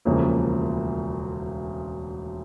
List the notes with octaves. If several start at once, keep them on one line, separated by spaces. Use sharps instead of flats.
E1 D2 C#3 F3 A#3